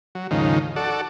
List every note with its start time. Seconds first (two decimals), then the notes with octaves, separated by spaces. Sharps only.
0.15 F#3
0.31 D#2 G#2 C#3 F3 D#4
0.76 F#4 A4 D5